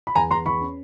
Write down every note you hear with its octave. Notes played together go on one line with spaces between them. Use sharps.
B5
E2 G#5 A#5
E2 A#5 C6
E2 B5 C#6
C#4